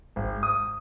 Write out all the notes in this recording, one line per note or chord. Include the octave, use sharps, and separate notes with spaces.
G#1
D#6